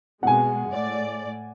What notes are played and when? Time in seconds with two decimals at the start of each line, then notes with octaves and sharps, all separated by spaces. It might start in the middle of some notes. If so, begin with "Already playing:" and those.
0.23 B2 G#3 F#5 G#5
0.70 A2 D5